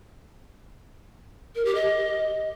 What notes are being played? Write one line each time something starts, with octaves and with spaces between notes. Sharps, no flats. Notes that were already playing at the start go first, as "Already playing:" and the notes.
A#4
G4
D#5